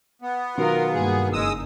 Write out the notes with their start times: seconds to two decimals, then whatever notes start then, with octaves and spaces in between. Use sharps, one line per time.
0.22 B3
0.58 B2 D#3 F#3 F4 A#4
0.93 G2 A#3 G#4
1.33 F#1 G#3 D#4 D#6 E6